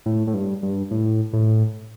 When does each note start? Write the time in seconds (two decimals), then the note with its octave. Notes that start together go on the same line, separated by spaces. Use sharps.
0.06 A2
0.27 A2
0.34 G2
0.63 G2
0.91 A2
1.33 A2